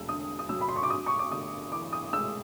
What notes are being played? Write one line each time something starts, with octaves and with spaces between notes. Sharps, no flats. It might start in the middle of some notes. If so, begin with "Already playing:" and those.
Already playing: E1 E6
D3 D#6
D#6
F#3 E6
B5
C6
C#6
D6
G2 D#6
C#6
D6
G1 D#6
E3 D6
D#6
G#3 E6